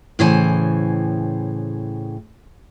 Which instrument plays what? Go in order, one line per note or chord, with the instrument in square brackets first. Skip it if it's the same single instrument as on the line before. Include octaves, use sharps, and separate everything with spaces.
[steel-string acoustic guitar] A2 C#3 E3 C5 G#5